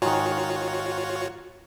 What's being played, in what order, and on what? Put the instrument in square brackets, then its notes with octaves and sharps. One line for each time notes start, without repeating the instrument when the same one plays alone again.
[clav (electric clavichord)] G#2 D#3 [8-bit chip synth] F4 F#4 C#5